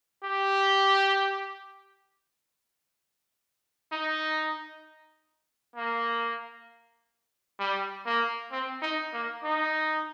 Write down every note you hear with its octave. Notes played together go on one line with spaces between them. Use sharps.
G4
D#4
A#3
G3
A#3
C4
D#4
A#3
D#4